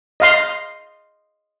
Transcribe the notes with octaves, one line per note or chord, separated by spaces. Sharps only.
D#5 F5 C6